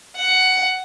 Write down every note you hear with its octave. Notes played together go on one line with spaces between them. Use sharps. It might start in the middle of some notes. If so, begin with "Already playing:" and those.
F#5